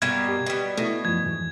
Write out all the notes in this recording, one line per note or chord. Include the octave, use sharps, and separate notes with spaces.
G2 B2 G3 A#3 G#6
G4
B2 G3
B2 A3 E4
F#2 F3 G#6
F2 G#2 E3